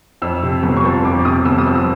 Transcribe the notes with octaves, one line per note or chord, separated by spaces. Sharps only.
F2 E6
C3
G1
C#6
F3
F2 D6
C3 D#6
G1 E6
D#6
F3 E6